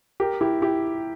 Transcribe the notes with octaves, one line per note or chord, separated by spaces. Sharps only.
G4 A#4
E4 G4
E4 G4